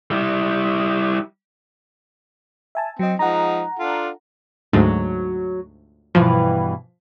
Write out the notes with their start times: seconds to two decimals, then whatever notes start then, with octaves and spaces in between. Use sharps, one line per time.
0.11 G3 E4
2.75 E5 G#5 A5
2.99 F#3 C4 D#5
3.19 F3 G#3 D#4 F#5 A#5
3.79 D4 F4 A4
4.73 D2 G#2 F#3
6.15 G2 B2 E3 F3